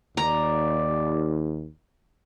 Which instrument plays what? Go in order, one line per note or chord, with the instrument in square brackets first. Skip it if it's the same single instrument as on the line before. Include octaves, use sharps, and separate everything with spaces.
[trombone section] D#2 [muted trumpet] D5 [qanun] A#5